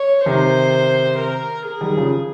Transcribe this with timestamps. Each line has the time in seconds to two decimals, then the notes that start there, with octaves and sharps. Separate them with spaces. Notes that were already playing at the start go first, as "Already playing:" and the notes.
Already playing: C#5
0.26 C3 D#3 C5
1.19 A#4
1.65 G#4
1.81 D#3 G3
1.97 C#3 F3